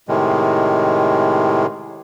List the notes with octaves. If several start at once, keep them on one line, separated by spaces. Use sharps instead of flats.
A2 C3 D#3 G#3